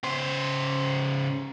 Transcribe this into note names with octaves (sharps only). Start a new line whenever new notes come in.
C#3 C5